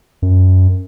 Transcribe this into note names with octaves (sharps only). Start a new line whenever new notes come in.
F#2